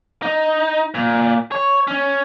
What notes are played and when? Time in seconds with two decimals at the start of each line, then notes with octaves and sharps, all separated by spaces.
0.22 D#4
0.95 A#2
1.52 C#5
1.87 C#4